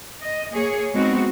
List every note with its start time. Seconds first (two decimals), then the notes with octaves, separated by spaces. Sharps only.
0.22 D#5
0.52 A#3 G#4 C#5
0.95 G#3 B3 C4 D#4 F#4